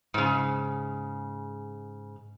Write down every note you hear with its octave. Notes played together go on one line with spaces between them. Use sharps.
G#2 C#3